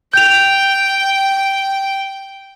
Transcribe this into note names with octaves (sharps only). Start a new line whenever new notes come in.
G5 G6 F7